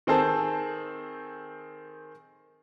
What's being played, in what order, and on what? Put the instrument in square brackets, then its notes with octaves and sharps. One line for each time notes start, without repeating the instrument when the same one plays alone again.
[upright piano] D#3 C4 G#4 A4 C5